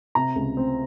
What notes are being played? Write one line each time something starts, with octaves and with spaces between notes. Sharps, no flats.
C3 A#5
C#2
C4